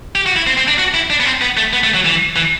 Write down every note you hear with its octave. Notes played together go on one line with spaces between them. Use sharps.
G4
F#4
E4
C4
C4
D4
F#4
E4
D4
B3
C4
B3
A3
B3
A3
F#3
E3
E3